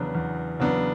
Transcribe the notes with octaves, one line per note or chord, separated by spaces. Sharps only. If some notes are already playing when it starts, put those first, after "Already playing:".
Already playing: E2 C#3 F#3 B3 D4
E2
C#3 F#3 B3 D4